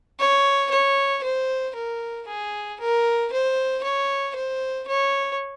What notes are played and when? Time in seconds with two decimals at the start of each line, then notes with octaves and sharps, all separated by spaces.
0.19 C#5
0.71 C#5
1.23 C5
1.75 A#4
2.27 G#4
2.80 A#4
3.32 C5
3.84 C#5
4.35 C5
4.87 C#5